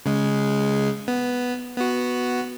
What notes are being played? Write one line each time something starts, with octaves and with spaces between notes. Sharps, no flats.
C#3 G#3
B3
B3 F#4